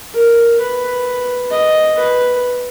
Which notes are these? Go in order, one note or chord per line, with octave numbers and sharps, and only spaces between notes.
A#4
B4
D#5
B4